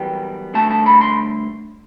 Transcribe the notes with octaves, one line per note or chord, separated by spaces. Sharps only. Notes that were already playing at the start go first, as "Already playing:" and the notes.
Already playing: F#2 E3 G3 B3 G5
G2 D3 A3 A5
A5
B5
C6